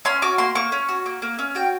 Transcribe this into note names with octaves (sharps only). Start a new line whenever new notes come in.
C#4 C6
F#4 D6
A#3 C6
A#3 C#6
C#4
F#4
A#3
A#3
C#4
F#4 G5